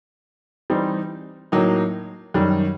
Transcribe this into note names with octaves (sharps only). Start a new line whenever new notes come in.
E3 G3 C4 D#4
A2 F#3 A#3 D#4
F#2 D#3 G3